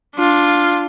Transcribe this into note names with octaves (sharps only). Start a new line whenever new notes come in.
D4 F4